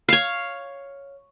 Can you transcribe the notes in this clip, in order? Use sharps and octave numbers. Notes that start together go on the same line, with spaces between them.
C#5 F5